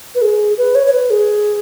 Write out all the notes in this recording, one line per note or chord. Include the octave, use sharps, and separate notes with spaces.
B4
G#4
B4
C#5
C#5
B4
G#4